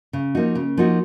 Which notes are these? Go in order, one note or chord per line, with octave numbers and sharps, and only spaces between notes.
C#3
F3 A#3 D#4 F#4
C#3
F3 A#3 D#4 F#4